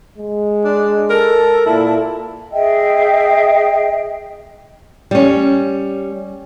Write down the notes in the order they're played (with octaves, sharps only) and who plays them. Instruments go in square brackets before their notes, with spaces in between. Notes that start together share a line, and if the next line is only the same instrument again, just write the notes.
[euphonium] G#3
[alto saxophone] D4
[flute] A4 [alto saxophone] A#4
[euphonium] A#2 [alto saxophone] E4
[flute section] G#4 D#5 E5 G5
[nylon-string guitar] G3 C#4